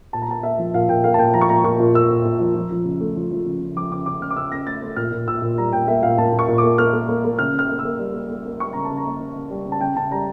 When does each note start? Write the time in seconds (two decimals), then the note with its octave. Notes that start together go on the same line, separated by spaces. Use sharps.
0.13 A#2 A5
0.22 A#5
0.28 A#3 A5
0.43 A#3 E5
0.58 F3
0.74 A#2 F5
0.89 A#2 G5
1.04 A#3 F5
1.14 A5
1.19 A#2 G5
1.34 F3 A#5
1.41 C#6
1.49 A#2 A#5
1.64 A#2 C#6
1.80 A#2
1.94 A#2 E6
2.10 A#2
2.25 A#2
2.40 F3
2.55 F3
2.71 F3
2.85 C#3
3.01 A3
3.16 F3
3.31 F3
3.46 C#3
3.60 C#3
3.76 F3 D6
3.91 C#3 D6
4.06 C#3 D6
4.21 C#3 F6
4.30 D6
4.36 C#3 E6
4.52 C#3 A#6
4.66 A3 A6
4.82 A3
4.96 A#2 F6
5.12 A#2
5.27 A#2 E6
5.42 A#2
5.57 G3 A#5
5.72 A#2 G5
5.87 A#3 E5
6.02 A#2 F5
6.18 A#2 A5
6.33 A#2
6.39 C#6
6.48 A#2
6.58 D6
6.63 A#3
6.78 A#3 F6
6.93 A#3
7.09 A#3
7.24 A#3
7.39 C#3 F6
7.53 C#3
7.59 F6
7.69 A#3
7.79 E6
7.85 A#3
7.99 G3
8.14 A#3
8.30 A#3
8.45 A#3
8.60 G3 C#6
8.73 C#3 A#5
8.85 C#3 A5
8.97 A#5
9.05 A#3
9.21 C#3
9.35 C#3
9.50 G3
9.65 C#3
9.72 A5
9.81 C#3 G5
9.95 C#3 A5
10.11 G3 A#5